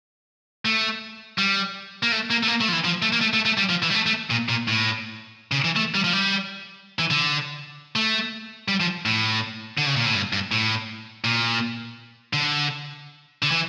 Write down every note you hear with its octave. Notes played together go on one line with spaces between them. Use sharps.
A3
G3
A#3
A3
A#3
A3
A#3
A3
F3
E3
F3
A3
A#3
A3
A3
A3
G3
F3
E3
G3
A3
A3
A#2
A#2
A2
C#3
E3
A3
G3
F3
G3
E3
D3
A3
G3
F3
A2
D3
C#3
A#2
A2
G2
G2
A2
A#2
D3
D3
E3